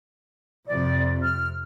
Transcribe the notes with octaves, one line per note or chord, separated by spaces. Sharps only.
F2 C3 D5
F6